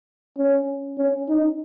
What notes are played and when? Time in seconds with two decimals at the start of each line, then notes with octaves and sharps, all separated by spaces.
0.38 C#4
0.98 C#4
1.28 D#4